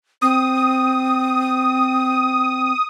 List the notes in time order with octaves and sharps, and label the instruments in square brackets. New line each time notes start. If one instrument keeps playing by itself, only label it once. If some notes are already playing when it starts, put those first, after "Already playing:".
[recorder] C4 [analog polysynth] D#6